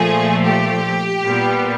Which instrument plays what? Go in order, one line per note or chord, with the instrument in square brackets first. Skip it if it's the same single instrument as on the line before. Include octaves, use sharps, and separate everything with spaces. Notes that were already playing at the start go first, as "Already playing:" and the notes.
Already playing: [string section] A#2 F3 A3 G#4
G4
A#2 G3 B3